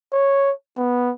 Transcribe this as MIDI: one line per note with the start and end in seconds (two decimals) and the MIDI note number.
0.13 0.52 73
0.77 1.12 59